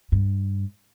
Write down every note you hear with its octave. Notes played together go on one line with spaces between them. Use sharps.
G2